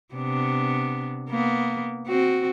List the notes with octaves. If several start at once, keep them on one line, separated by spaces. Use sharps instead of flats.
C3 B3 D4
A#3 B3
C4 F#4